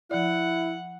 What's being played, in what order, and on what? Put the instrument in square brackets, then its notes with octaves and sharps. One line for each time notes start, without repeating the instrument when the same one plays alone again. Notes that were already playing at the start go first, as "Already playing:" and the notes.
[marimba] F3 D5 [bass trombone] E4 [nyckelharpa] F#5